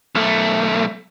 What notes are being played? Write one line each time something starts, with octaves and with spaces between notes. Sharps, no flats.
B1 A3